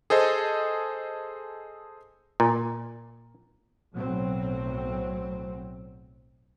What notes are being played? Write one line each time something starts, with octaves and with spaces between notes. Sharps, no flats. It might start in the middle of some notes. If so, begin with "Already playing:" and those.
G#4 A4 C5 D#5
A#2
B1 A2 F#3 C4